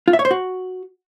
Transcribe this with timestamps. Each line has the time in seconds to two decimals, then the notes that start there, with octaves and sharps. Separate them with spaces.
0.08 F4
0.13 E5
0.19 C#5
0.25 C5
0.31 F#4